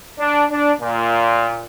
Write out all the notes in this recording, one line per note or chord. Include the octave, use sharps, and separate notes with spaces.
D4
D4
A#2